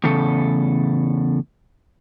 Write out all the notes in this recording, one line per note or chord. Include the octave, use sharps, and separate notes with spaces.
E2 A2 C#3 A4